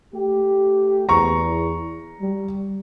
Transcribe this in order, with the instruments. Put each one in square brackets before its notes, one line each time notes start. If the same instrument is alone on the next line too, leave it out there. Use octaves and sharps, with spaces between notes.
[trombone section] A3 G4
[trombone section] E2 [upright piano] A#5 C#6
[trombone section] G3